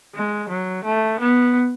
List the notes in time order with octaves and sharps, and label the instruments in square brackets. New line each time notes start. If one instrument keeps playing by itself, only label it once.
[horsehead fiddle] G#3
F#3
A3
B3